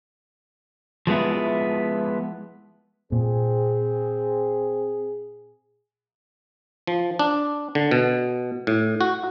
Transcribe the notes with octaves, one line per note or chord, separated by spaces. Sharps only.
F3 G#3 B3 E4
A#2 C4 G#4
F3
D4
D3
B2
A2
F#4